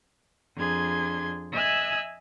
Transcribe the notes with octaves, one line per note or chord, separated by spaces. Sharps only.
F2 D4 G#4 C6 G#6
D#5 E5 G#5 E6 F#6 G#6